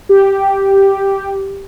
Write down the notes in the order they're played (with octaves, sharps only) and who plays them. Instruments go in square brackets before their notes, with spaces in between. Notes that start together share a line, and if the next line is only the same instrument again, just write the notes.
[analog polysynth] G4